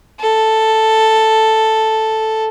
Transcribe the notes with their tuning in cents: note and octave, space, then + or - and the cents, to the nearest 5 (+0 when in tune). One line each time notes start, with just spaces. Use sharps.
A4 +0